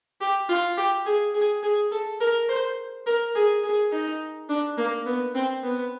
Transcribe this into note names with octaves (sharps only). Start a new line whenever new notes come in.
G4
F4
G4
G#4
G#4
G#4
A4
A#4
C5
A#4
G#4
G#4
D#4
D4
A#3
B3
C4
B3